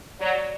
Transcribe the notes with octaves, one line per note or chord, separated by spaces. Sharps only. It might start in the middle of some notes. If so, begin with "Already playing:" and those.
F#3 D5